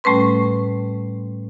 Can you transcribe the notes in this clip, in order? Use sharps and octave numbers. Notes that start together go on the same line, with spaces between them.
A2 G3 A3 C#4 B4 C6